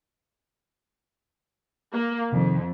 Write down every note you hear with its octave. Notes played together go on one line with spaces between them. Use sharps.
A#3
F2 C3 D#3